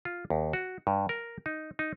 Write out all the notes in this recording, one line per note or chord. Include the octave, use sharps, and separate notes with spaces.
F4
D#2
F#4
G2
A#4
D#4
D#4